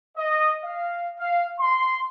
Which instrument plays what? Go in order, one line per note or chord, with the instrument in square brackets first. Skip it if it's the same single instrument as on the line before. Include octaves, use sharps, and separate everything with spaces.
[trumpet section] D#5
F5
F5
C6